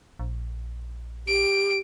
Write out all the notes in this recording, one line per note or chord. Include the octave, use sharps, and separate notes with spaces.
A#1
G4 D7